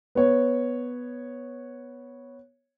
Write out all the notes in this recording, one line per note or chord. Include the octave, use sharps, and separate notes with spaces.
B3 C#5